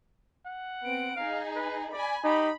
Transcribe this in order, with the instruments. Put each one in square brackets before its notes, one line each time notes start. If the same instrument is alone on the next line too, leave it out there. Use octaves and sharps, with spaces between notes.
[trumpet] F#5
[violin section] B3 C4 D7
[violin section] D#4 G#4 [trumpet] F5
[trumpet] B4
[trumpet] D5 [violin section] G#5 B5
[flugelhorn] D#4 [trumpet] G4 [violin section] B5